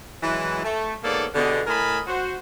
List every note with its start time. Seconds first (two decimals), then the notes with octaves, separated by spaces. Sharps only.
0.23 E3 F#3 G#3
0.64 A3
1.04 G#2 A#3 B3 A4 C#5 D5
1.35 B2 D3 B3 G4 G#4 D#5
1.67 A2 A#4 D#5 G#5 A5 B5
2.07 F#4 C5